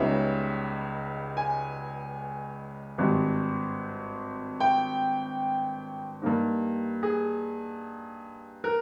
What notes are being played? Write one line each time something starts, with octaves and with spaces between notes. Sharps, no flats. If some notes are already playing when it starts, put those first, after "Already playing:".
Already playing: C#2 C#3 G3 B3 D#4 E5
G#5
G#1 G2 G3
G5
G2 G3 A#3 D#4
G#4
A#4